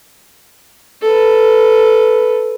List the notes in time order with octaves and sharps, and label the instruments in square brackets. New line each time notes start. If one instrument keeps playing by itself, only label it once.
[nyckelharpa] A4 B4